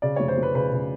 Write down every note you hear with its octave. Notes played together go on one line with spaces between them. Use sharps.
C#3 D5
F1 C#5
C5
F1
B4
C#3 B4
C#3